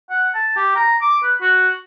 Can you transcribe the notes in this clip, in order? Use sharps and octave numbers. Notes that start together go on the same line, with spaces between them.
F#5
A5
G4
A#5
D6
B4
F#4